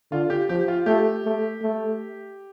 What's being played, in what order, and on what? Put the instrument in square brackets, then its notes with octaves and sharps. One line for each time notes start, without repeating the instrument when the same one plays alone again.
[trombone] D3 [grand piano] F4
[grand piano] G4
[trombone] F3 [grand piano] G4
[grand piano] F4
[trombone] A3 [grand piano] G4
[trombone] A3
A3